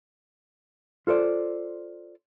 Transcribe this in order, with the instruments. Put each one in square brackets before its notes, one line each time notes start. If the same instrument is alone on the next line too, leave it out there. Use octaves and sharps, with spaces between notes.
[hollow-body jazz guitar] F4 A4 C5 D5